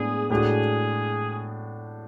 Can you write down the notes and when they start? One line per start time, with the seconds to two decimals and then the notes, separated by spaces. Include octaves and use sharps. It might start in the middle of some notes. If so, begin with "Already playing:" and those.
Already playing: A2 G#3 B3 D4 G#4
0.30 A2 G#3 D4 F#4 G#4